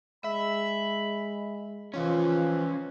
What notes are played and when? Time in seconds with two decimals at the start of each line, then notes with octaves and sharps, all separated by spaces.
0.24 G#3 E5 B5
1.94 E3 F3 C#4 F4